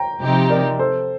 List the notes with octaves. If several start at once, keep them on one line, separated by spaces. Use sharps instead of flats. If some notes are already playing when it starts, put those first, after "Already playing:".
Already playing: G5 A#5
C3 F3 C4 D#4 G4
A#4 D5
A4 C5